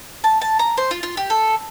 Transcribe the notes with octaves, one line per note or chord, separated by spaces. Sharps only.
A5
A5
A#5
C5
F4
F4
G4
A4